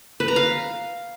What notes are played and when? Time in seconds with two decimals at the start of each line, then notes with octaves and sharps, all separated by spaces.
0.20 B4
0.28 A#5
0.36 F5